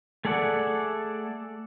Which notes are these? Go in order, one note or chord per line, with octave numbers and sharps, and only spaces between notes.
A3 G#4 A4 D5 F#5